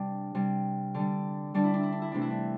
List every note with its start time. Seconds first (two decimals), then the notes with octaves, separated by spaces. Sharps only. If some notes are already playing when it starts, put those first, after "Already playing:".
Already playing: C3 G3 D4
0.35 C3 G3
0.94 D3 G3
1.54 D3 G3 D4
1.64 E4
1.74 D4
1.83 E4
1.92 D4
2.02 E4
2.12 C3 E3 A3 D4
2.22 E4
2.30 D4